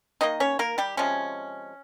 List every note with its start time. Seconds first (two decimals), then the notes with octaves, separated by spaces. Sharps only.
0.21 D#3 A#3 D#4 D#5
0.40 C#4 C#5
0.59 A#3 A#4
0.78 G3 G4
0.97 C3 F3 G#3 C#4